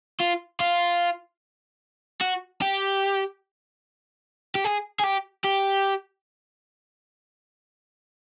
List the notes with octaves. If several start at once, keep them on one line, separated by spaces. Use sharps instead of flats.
F4
F4
F#4
G4
G4
G#4
G#4
G4
G4